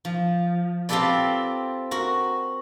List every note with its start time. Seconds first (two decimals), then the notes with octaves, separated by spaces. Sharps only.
0.05 F3
0.89 C4 F4 G4 A4 B4 D5
1.91 F#4 A#4